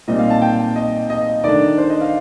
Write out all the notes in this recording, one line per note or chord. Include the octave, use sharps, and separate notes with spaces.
A#2 G3 C4 D#4 D#5
F5
A5
G5
D#5
D#5
D#3 A3 D4 D5
C5
D#5
F5